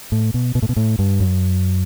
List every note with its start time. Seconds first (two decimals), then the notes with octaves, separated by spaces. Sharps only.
0.12 A2
0.34 B2
0.55 B2
0.62 A2
0.69 B2
0.76 A2
0.99 G2
1.20 F#2